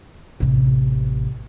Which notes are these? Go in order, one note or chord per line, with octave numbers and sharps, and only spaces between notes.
A1 C3